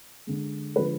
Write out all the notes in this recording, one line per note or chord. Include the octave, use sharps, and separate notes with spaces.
D3 G#3
D3 F3 G#3 B4